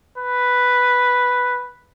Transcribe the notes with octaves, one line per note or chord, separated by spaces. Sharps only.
B4